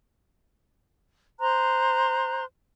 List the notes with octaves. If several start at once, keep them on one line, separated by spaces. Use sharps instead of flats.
C5 A#5 C6 F#6